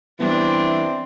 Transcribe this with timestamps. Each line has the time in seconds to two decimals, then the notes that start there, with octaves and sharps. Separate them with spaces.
0.20 E3 G3 B3 C4 D4